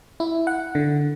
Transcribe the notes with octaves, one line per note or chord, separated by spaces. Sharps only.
E4
F#5
D3